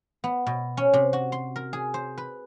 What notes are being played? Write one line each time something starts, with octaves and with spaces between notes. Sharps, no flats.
B3
B2
C#4
C3
F#4
C6
A#4
G#4
C5
B4